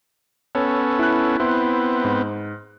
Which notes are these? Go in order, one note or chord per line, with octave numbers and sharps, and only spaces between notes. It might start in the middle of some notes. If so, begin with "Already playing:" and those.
B3 C#4 A4 C#5
E4 F#6
B3 C4 E4 C6
G#2